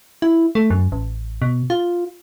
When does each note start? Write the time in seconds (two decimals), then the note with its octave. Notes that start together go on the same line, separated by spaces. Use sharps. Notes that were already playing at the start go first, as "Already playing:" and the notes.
0.22 E4
0.55 A3
0.70 F#2
0.92 A1
1.42 B2
1.70 F4